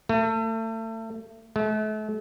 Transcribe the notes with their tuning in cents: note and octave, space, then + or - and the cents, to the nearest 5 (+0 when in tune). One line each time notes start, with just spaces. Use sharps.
A3 +30
A3 -40